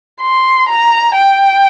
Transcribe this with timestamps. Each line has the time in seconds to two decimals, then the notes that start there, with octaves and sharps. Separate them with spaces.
0.22 C6
0.69 A#5
1.15 G5